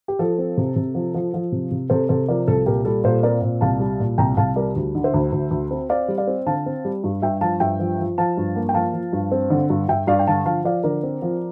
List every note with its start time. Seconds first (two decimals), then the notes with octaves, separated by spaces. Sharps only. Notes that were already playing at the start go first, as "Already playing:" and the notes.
0.08 G4
0.19 F3 A4
0.38 C4
0.57 C3
0.76 C3
0.95 F3
1.14 F3
1.34 F3
1.52 C3
1.71 C3
1.90 C3 A4 C5
2.09 C3 A4 C5
2.28 F3 A#4 D5
2.48 C2 A4
2.66 A#2 G4 A#4
2.85 G3 A4
3.04 A#2 A4 C5
3.23 C4 A#4 D5
3.42 A#2
3.61 C2 F5 A5
3.80 G3
4.00 A#2
4.18 C2 G5 A#5
4.37 C2 F5 A5
4.56 G3 A#4 D5
4.76 D2
4.95 D3
5.04 C5 E5
5.14 D2
5.32 D2
5.51 D2
5.71 C4
5.89 C4 D5 F5
6.08 G3
6.18 D5 F5
6.27 C4
6.46 D3 F5 A5
6.66 C4
6.85 G3
7.04 G2
7.22 G2 E5 G5
7.41 F3 F5 A5
7.60 G2 E5 G5
7.79 F3
7.99 F3
8.18 F3 F5 A5
8.37 G2
8.56 A#3
8.69 G5
8.74 F3 F5 A5
8.93 F3
9.13 G2
9.32 C4
9.50 D3
9.70 G2
9.88 G2 E5 G5
10.07 G2 D5 F5
10.19 G5
10.27 D3 F5 A5
10.45 F3 F5 A5
10.65 F3 D5 F5
10.83 D3 A#4 D5
11.03 C4
11.22 F3